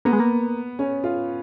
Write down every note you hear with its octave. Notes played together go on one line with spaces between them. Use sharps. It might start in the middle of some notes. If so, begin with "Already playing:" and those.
A#3 B3
G#3
A#3
C#4
F4